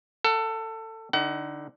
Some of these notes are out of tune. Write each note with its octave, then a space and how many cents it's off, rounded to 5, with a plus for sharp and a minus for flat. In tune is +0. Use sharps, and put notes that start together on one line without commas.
A4 +20 F#5 +15
D3 +0 D#4 +25 F#5 +35